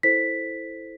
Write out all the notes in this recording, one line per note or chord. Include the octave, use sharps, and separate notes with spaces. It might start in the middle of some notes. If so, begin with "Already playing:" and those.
E4 A4 C5 B6